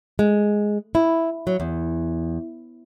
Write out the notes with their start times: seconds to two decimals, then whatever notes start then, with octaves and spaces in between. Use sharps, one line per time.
0.19 G#3
0.95 E4
1.47 F#3
1.60 E2